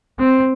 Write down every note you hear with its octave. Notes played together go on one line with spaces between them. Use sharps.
C4